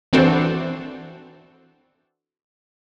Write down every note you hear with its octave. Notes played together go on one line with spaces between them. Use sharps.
E3 C4 D4 F#4 A4 C5